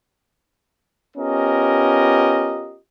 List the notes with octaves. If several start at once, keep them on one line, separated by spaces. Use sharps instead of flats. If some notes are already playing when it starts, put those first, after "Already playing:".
B3 C#4 F4 G4 A#4 D#5